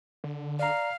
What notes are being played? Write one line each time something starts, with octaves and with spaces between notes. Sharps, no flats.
D3
D5 F5 A#5